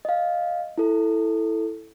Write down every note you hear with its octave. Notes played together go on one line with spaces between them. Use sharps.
D#5 F5
E4 A4